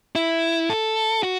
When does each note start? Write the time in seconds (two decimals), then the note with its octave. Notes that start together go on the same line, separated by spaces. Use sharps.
0.15 E4
0.69 A4
1.23 F#4